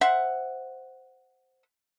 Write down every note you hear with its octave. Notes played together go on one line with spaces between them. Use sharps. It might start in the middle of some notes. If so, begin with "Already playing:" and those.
C5 E5 F#5